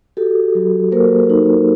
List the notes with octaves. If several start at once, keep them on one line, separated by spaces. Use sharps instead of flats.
F#4 G4 A4
F#3
A#3 A#4 C5
D#4